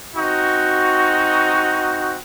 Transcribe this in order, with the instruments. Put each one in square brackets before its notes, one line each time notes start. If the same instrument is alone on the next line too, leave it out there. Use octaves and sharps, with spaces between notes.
[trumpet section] C4 D#4 F#4